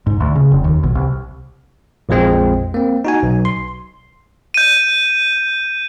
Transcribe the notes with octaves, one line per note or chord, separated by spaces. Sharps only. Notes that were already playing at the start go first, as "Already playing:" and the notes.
G#2
D2
C#3
F1
D#2
B1
C2
A#1 F2 F3 G#3 C4
A#3 C4
D#4 F#4 G#5
B1
C6
G6 D#7